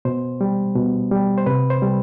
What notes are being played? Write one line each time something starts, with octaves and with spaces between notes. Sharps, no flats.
B2 C5
G3
B2
G3
C5
C3 B4
C5
G3